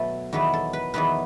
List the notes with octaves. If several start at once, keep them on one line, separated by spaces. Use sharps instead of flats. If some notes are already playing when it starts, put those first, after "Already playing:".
Already playing: B2 F#3 A3 A4 B4
E2 D#3 F#3 B3 B4
A4
B4
E2 D#3 F#3 B3 B4